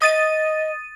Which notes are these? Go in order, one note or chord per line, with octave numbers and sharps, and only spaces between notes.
D#5 D#6 A6 D#7